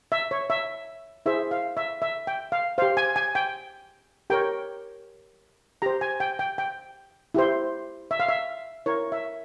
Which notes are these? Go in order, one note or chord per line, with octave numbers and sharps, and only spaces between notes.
E5
C#5
E5
E4 G#4 C5 E5
F5
E5
E5
G5
F5
G4 C5 F5
G#5
G#5
G5
G4 A#4 C#5 G5
G4 C5 A#5
G#5
G5
G5
G5
E4 G4 C5
E5
F5
E5
E4 A#4 C#5
E5